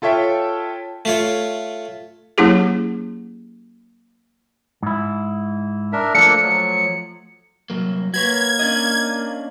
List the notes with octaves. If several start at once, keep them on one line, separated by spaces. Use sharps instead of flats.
F4 A4 C#5 E5 G5
A3 F4 C#5
F#3 A#3 C#4 E4 G4 G#4
G#2 E4
D4 A#4 E5
F3 A3 A#3 D4 A4 C#7
F#3
C2 F#3 A#3
A#3 F#4 B4 C#5 G#6
C#4 D4 D#5